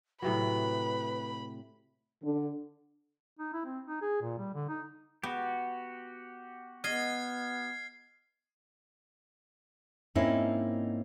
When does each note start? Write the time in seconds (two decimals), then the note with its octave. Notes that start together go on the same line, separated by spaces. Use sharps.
0.22 A2 C3 F#3 B4 B5
2.24 D3
3.39 D#4
3.53 E4
3.65 C4
3.88 D#4
4.02 G#4
4.22 A#2
4.38 G3
4.54 D3
4.69 D#4
5.23 B3 F#4 G4
6.84 B3 D#5 F6 G#6 C7
10.15 G#2 A#3 C4 C#4 D#4 E4